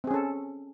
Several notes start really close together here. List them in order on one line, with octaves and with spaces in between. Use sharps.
C4 G#4 C#4 A4